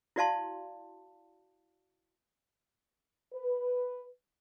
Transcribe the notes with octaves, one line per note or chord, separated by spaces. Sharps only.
E4 F#4 D5 F5 A5 C6
B4